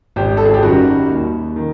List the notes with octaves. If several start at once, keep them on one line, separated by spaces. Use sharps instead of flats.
G#1 G4
A4
G#4
G4
F#2 D#3 G3 F#4
D#2
D#3